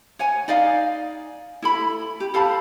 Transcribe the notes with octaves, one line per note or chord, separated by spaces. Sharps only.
C#5 F#5 G#5
D#4 D5 D#5 F5
E4 A4 B5
G4
A4 F5 A5 B5